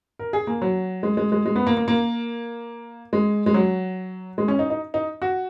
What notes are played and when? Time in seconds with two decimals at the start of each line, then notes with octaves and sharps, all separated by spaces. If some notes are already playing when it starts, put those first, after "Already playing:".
0.19 A#4
0.33 G#4
0.47 A#3
0.62 F#3
1.03 G#3
1.17 G#3
1.32 G#3
1.46 G#3
1.56 B3
1.67 A#3
1.77 A#3
1.88 A#3
3.13 G#3
3.46 G#3
3.54 F#3
4.38 G#3
4.48 C#4
4.59 D#4
4.70 D#4
4.94 D#4
5.22 F#4